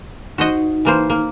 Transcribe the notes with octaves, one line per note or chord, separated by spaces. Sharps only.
D#4 F#4 C5 D#5
E3 A#3 C5
A#3